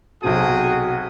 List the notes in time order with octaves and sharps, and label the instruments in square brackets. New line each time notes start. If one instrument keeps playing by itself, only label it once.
[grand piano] B1 C3 A5 [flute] F#4 [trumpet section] G#4 G5 D#6